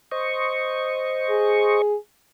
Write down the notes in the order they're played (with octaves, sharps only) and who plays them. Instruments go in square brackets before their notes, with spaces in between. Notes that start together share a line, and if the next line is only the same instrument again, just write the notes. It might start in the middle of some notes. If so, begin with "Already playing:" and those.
[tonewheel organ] C5 D#5 C#6
[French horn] G#4